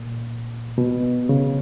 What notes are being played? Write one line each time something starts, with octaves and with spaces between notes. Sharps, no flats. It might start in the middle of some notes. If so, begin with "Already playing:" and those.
Already playing: A#2
B2
C#3